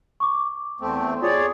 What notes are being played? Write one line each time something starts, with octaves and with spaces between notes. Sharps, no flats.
C#6 D6
E2 A3 C4
F4 G#4 C#5 D5